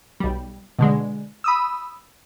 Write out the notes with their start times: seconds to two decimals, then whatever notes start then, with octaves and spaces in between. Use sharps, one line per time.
0.20 B1 G3
0.79 B2 D3 G#3
1.44 B5 D#6 E6